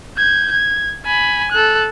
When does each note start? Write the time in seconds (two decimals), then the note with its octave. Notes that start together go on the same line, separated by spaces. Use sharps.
0.18 G6 G#6
0.52 G#6
1.05 G#5 B5
1.52 A4 F#6